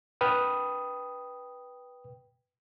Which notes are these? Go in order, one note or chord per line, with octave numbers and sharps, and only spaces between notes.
B4 G5 D#6 F6